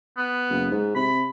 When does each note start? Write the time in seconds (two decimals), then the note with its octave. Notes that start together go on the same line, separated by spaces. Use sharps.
0.17 B3
0.50 F#1
0.71 G#2
0.95 C3 B5